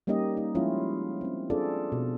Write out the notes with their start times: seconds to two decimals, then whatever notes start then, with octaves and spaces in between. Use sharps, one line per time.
0.07 G3 A#3 C#4 D#4 G4 D#5
0.37 D#4
0.55 F3 G#3 C#4 E4 F4
1.21 C4 C#4
1.50 C4 D4 F4 G#4 A4 D5
1.92 B2